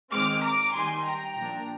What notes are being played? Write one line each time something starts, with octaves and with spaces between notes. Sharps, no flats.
D#3 G#3 C4 D6 F6
A#5 D6
D#3 G3 A#3 D#4 G#5 C6
G5 A#5
A#2 F3 A#3 D4